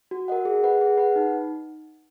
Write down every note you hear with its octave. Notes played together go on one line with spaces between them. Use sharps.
F#4
A#4 D#5 F#5
G#4
B4 F#5
G#4
B4 F#5
D#4